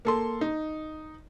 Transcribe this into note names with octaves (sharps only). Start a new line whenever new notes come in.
A#3 A4 C6
D#4